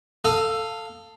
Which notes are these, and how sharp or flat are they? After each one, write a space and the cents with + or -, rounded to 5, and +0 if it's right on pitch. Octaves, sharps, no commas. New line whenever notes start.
A4 +15 F5 +0 D#6 +0